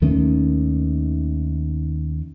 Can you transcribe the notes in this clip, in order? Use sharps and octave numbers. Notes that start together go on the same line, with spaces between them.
D#2 D#3 A3 C#4